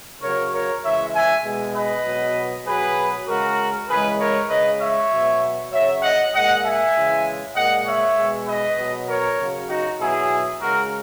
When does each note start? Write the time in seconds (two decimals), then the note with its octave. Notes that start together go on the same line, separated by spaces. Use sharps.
0.22 C#3 F#3 A#4 C#5
0.53 A#4 C#5
0.84 C#3 E3 G#3 C#5 E5
1.14 E5 G#5
1.44 B2 G#3
1.75 B4 D#5
2.05 B2 F#3
2.67 B2 F#3 G#4 B4
3.28 C#3 G#3 F#4 A#4
3.89 C#3 E3 G#3 G#4 B4
4.19 A#4 C#5
4.50 C#3 G#3 B4 D#5
4.80 C#5 E5
5.11 B2 F#3
5.72 C#3 F#3 C#5 E5
6.02 D#5 F#5
6.33 A#2 G#3 D#5 F#5
6.64 E5 G#5
6.94 C#3 E3 G#3
7.55 A#2 G#3 D#5 F#5
7.86 C#5 E5
8.17 B2 G#3
8.47 B4 D#5
8.78 B2 F#3
9.08 A#4 C#5
9.39 C#3 F#3
9.69 D#4 F#4
10.00 B2 F#3 E4 G#4
10.61 C#3 G#3 F#4 A#4